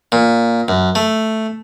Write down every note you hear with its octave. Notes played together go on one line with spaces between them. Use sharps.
A#2
F#2
A3